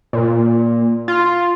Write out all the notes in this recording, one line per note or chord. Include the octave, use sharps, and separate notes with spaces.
A#2
F4